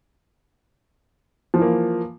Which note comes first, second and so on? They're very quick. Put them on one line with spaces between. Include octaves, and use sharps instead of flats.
F3 E3 A#3